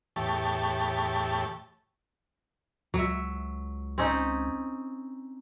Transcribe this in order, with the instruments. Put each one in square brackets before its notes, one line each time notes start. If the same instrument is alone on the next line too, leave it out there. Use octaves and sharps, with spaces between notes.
[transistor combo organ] E2 A2 G4 C#5 A5
[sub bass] C#2 [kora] F#3 E5
[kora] C4 C#4 D#4